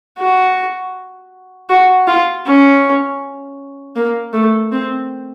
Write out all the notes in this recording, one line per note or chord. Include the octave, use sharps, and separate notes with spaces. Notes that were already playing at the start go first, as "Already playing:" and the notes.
F#4
F#4
F4
C#4
A#3
A3
C4